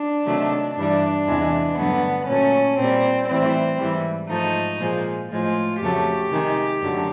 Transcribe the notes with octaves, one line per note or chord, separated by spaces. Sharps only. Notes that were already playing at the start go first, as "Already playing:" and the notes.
Already playing: D4
C3 D#3 F#3 A3
G2 E3 G3 D4
E2 C3 E3 G#3
G2 D3 F#3 A3 B3
A#2 F#3 A3 C#4
A#2 G3 C4
A2 E3 G3 C4
G#2 E3 G3
G#2 F3 A3 D#4
A#2 F3 G#3
A2 F3 G#3 F4
F2 C#3 F#3 A3 G4
C3 D#3 G#3
F#2 D3 F#3 A3